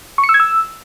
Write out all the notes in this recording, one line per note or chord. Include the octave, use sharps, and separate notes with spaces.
C#6
C#7
E6
G#6
E6